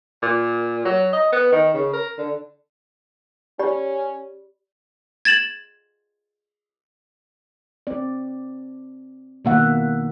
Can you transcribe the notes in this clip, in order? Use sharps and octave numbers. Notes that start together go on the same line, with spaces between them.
A#2
F#3
D#5
B3
D#3
C#3
A#4
D3
C#4 G4 D5 B5
G#6 A6 E7 F#7
C4 D5
B2 D#3 A#3 E5 F#5